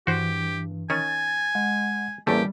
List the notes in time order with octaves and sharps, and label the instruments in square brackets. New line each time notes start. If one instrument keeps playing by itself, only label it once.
[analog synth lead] G2 [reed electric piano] E3 [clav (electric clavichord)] F#4 C5 [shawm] G4
[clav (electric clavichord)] D#3 C#4 [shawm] G#5 [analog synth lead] A6
[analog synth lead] G#3 [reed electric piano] F#5
[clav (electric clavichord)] A1 E2 A3 [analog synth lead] G3 [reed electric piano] A#3 G#4 A#4 [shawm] G4